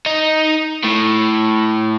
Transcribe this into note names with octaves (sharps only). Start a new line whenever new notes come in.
D#4
A2